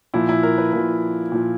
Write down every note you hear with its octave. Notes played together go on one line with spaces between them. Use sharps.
A#2 F3 E4
E4
A#4
B4
A#2 F3 A#4
A#2 F3